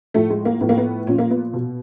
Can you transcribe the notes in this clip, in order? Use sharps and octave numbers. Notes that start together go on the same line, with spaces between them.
A2 F3 A3
G#3
A#3
A2 F3 B3
A#3
B3
A#2 F3 C#4
A#3
B3
B2